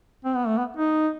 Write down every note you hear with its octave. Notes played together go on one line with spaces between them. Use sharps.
C4
B3
A3
B3
D#4